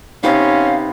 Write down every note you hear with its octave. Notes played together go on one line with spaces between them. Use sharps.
C3 B3 C#4 D#4 G4 C5 F5